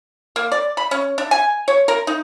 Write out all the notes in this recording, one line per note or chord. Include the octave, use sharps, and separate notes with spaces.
A#3
D5
B5
C#4
D4
G#5
C#5
A#4
D#4